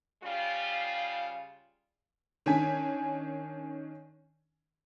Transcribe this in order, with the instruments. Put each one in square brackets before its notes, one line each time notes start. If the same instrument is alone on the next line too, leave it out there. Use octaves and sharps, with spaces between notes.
[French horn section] C#3 G3 F4
[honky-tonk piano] D#3 C#4 D4 G#5 B6